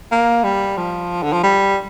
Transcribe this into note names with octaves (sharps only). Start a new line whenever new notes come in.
A#3
G3
F3
D3
F3
G3